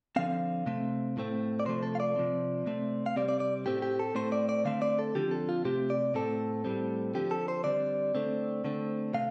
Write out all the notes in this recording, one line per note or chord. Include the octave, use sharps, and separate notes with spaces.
D3 F3 C4 F5
C3 A3 C4
A2 A3 C4
D5
C3 F3 A3 C5
A4
F5
D5
C3 F3 C4
C3 A3 C4
F5
C3 G3 C4 D5
D5
D5
A2 A3 C4 G4
G4
A4
A2 A3 C4 C5
D5
D5
D3 A3 C4 F5
D5
A4
D3 F3 C4 G4
A4
F4
C3 A3 C4 G4
D5
A2 A3 C4 A4
A2 G3 C4
D3 F3 C4 G4
A4
C5
D3 G3 C4 D5
D3 A3 C4
D3 A3 C4
C3 A3 F5